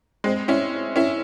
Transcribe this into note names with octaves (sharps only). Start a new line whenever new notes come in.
G#3 C4
C#4 E4
C#4 E4